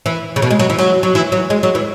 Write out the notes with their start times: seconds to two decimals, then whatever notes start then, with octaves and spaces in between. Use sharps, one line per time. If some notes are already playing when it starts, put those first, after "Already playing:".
0.06 E3
0.36 C#3
0.42 B2
0.51 G#3
0.59 F#3
0.70 E3
0.79 F#3
1.03 F#3
1.15 E3
1.32 F#3
1.50 G#3
1.63 F#3
1.75 E3